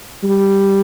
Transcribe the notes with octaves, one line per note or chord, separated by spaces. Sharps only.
G3